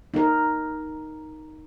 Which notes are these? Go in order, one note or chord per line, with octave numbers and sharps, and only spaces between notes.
D#4 A#4